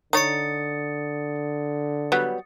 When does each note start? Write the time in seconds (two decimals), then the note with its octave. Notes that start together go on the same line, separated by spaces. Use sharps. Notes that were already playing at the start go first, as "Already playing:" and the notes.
0.13 D3 D#4 C#5 D#6 A6 C#7
2.12 F#3 G3 B3